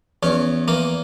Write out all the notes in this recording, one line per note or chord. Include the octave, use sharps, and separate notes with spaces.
E2 C#4
E3 A#3